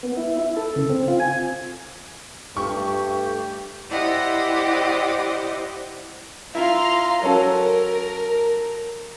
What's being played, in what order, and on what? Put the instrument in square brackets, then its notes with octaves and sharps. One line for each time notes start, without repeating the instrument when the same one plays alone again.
[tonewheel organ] B3
E4
E4
A4
C#3
C4
F4
G#5
[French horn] G2 [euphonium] A3 [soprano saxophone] G4 [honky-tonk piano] C#6
[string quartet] E4 G4 C5 D5 D#5 F#5
[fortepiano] E4 F4 [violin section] F5 A#5 C6
[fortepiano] F#3 C#4 A4 [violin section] A#4